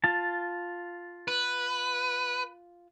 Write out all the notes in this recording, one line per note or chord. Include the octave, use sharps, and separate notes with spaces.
F4 A5
B4